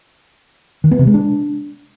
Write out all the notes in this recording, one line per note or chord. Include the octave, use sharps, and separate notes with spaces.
D#3
B3
C3
G#3
D4